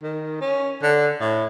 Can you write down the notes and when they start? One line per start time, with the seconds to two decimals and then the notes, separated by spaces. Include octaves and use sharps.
0.03 D#3
0.41 C#4
0.83 D3
1.20 A2